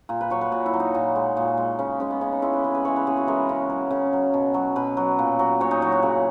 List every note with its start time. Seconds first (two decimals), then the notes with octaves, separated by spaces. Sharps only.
0.09 A#2 A#4
0.21 B4
0.30 F#3 C#5
0.41 B4
0.52 A#2 F#4
0.66 E4
0.73 F#3
0.80 D#4
0.94 A#2
1.16 G#3
1.37 A#2
1.58 G#3
1.79 C#3 C#4
2.00 G#3 C#4
2.10 B3
2.21 C#3 C#4
2.33 D#4
2.42 G#3 E4
2.53 B4
2.64 C#3 B4
2.74 B4
2.85 E3 G#3 C#5
2.96 B4
3.07 C#3 G#4
3.17 F#4
3.27 E3 G#3 A#4
3.49 C#3
3.70 F#3
3.91 C#3
4.13 F#3
4.34 B2
4.54 F#3
4.76 B2 B4
4.97 F#3
5.19 A#2
5.39 F#3
5.60 A#2 C#5
5.71 D#4
5.82 F#3 E4
5.92 F#4
6.03 C#3 G#4